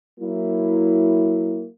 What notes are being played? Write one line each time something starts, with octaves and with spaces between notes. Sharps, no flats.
F#3 A#3 E4